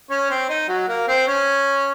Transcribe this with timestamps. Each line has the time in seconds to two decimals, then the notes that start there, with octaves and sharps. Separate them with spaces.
0.10 C#4 C#5
0.29 C4 C5
0.49 D#4 D#5
0.69 F#3 F#4
0.88 A#3 A#4
1.08 C4 C5
1.28 C#4 C#5